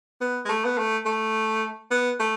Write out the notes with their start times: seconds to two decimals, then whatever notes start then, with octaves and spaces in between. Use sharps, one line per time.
0.21 B3
0.46 G#3
0.49 A3
0.65 B3
0.78 A3
1.06 A3
1.91 B3
2.20 A3